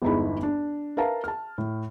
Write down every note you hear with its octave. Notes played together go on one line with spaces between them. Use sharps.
G1 E2 G#3 D#4 E4 B5
D4
A#4 B4 E5 F5 A5 A#5
A5 F6
A2